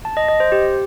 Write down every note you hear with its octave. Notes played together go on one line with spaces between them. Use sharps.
A5
D#5
D#5
C5
G4